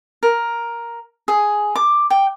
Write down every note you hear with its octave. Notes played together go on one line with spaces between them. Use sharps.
A#4
G#4
D6
G5